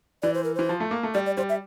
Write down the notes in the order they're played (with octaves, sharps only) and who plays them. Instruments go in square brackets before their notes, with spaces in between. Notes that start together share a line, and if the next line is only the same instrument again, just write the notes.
[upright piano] E3 [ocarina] D5
[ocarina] C5
A#4
[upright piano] E3 [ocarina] C5
[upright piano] F3
A3
A#3
A3
[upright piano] G3 [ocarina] D5
[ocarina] D5
[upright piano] G3 [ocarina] C5
[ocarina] E5